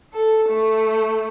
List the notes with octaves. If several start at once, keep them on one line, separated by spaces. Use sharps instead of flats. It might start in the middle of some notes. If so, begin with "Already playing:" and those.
A4
A3